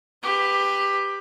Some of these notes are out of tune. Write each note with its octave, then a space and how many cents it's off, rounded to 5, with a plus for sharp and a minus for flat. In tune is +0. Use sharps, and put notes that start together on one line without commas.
G4 +15 B4 +15